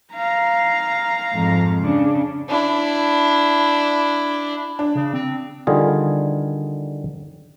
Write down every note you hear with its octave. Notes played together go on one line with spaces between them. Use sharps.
F5 A#5
F2 G#2
C#3 D4
D4 E4
D4
C#3
C4
D3 D#3 G3 F4 G#4